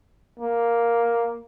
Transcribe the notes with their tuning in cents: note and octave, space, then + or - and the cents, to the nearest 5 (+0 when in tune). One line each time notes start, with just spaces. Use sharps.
A#3 +5